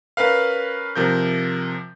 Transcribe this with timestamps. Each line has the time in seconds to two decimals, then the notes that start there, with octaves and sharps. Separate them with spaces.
0.17 C#4 A#4 B4 F5
0.96 C3 F3 A#4 G6